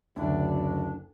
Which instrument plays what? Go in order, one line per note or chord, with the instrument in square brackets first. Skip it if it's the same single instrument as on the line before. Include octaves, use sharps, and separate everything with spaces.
[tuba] F#1 [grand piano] D2 E4 [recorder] D4